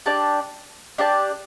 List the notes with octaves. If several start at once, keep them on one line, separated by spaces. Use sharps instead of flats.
D4 G4 D5 A5
D4 G4 D5 A5